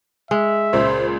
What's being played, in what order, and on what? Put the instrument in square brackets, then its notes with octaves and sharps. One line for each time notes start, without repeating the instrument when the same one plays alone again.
[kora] G#3 [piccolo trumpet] E5
[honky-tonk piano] C#2 A#2 [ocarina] C5